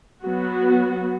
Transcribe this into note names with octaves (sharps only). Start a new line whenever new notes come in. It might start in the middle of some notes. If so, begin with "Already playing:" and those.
F#3 B3 F#4